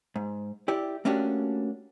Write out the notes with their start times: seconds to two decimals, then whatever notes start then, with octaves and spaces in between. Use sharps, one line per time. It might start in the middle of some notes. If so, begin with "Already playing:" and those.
0.16 G#2
0.68 E4 G4 D5
1.05 A3 A#3 C#4 D4 F#4 G4